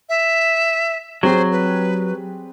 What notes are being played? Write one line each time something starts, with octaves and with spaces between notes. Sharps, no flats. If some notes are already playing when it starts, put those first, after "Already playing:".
E5
F#3 G3 C4 G#4 C5
B4